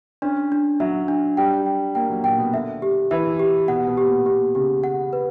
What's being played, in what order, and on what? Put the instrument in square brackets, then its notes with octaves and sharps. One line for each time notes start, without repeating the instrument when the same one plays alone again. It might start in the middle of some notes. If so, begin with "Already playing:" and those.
[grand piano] C#4 [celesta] D4
[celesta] D4
[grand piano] F#3 [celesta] E5
[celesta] D4
[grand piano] G3 [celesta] G5
[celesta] G5
[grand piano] A#3 [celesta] G5
[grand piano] F#3
[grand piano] A#2 [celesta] G5
[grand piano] B2
[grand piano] D3 [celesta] E5
[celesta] G4
[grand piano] E3 [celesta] E5
[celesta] G4
[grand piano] B2 [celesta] F#5
[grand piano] B2
[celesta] G4
[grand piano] A#2
[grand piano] B2 [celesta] G4
[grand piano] C#3 [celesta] G4
[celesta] F#5
B4